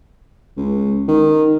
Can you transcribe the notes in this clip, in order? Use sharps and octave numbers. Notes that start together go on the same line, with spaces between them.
C#2
D#3